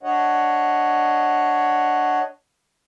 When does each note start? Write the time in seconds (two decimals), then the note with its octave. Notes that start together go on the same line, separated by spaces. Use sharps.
0.03 D4 C#5 D#5 F#5